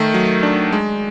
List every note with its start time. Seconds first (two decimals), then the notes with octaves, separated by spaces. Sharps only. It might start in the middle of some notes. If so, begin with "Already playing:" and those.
Already playing: D#3 A3
0.14 F#3
0.43 D4
0.72 G#3